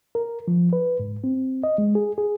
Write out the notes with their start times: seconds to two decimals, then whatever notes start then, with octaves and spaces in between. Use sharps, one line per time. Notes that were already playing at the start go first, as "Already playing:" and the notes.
0.15 A#4
0.48 F3
0.73 B4
0.99 G#2
1.24 C4
1.64 D#5
1.78 G#3
1.95 G#4
2.18 G#4